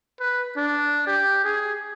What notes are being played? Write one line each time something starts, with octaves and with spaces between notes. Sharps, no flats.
B4
D4
G4
G#4